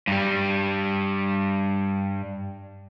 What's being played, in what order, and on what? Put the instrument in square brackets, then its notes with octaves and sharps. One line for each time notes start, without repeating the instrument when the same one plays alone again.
[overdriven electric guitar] G2 G3